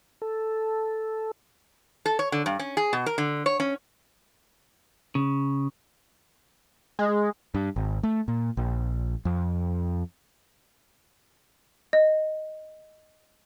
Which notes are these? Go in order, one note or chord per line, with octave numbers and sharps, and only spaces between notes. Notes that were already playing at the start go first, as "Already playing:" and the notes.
A4
A4
C#5
D3
G2
C#4
G#4
B2
A#4
D3
C#5
C#4
C#3
G#3
G2
G#1
A3
A#2
A#1
F2
D#5